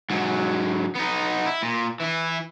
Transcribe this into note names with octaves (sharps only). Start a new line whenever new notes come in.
G#2 F#3
B3 D#4
E4
A#2
E3 E4